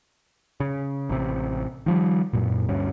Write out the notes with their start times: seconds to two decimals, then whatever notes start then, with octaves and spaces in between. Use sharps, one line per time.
0.60 C#3
1.10 A1 C3
1.86 D#3 F3 G3
2.33 F#2 A#2
2.68 D2 G2 C#4